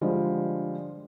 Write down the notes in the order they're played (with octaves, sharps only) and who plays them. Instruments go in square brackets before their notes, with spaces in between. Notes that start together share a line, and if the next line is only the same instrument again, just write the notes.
[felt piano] D3 F3 G3 G#3